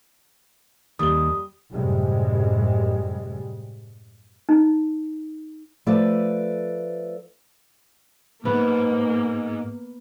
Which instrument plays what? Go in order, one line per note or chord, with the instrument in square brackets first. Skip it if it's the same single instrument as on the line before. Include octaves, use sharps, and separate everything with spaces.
[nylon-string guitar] D#2 [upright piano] G3 G7 [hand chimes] D#6
[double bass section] F#2 A2 C3 G3 G#3
[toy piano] D#4
[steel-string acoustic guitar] F3 A3 A4 B4 D5
[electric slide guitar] G#2 [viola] A#3 [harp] B3